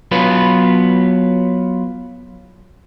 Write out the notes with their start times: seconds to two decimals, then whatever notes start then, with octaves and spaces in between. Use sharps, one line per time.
0.11 F#3 B3 F4 B4